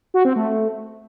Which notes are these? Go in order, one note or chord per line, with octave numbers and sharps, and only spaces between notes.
F#4
C4
A3